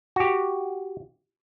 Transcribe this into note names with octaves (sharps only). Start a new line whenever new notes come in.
F#4 G4